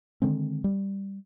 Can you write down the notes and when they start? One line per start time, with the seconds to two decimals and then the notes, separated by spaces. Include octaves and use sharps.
0.22 D3 D#3 G#3 C4
0.64 G3